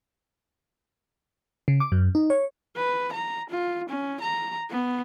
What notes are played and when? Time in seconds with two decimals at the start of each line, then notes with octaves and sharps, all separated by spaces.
1.68 C#3
1.80 D6
1.92 F#2
2.15 D#4
2.30 C#5
2.76 B4
3.12 A#5
3.49 F4
3.89 C#4
4.20 A#5
4.70 B3